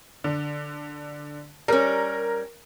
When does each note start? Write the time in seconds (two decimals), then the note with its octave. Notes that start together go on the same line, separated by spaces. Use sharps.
0.24 D3
1.68 G3 C#4 A#4